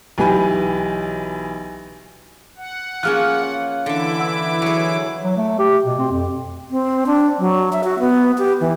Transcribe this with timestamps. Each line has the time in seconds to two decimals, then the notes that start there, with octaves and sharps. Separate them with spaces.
0.18 B1 E3 G4 G#5 B5
2.57 F#5
3.03 F3 A#3 C#4 G#4 F6 F#6
3.43 F5
3.86 D3 E3 E4 E5 D6
4.20 F#5 E6
4.62 F#3 G#4
5.24 F#3
5.37 A3
5.59 G4
5.86 B2
5.99 C4
6.12 F2
6.71 C4
7.07 D4
7.39 F#3
7.73 E5
7.84 F#4
7.99 B3
8.38 G4
8.61 E3